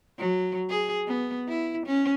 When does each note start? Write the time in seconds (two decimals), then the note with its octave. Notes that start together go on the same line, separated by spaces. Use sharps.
0.19 F#3
0.70 G#4
1.08 B3
1.48 E4
1.86 C#4